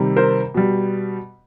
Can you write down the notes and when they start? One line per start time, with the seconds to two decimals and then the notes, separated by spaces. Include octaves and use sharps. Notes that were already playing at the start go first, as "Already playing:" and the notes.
Already playing: C3 D#3 G3
0.16 A#4 C5
0.54 B2 G3